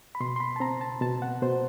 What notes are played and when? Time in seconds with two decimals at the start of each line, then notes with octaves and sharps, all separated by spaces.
0.15 B5
0.20 B2 C6
0.36 C6
0.40 B5
0.56 A5
0.60 C4 A#5
0.81 A5
1.02 B2 A5
1.22 F#5
1.42 B2 C5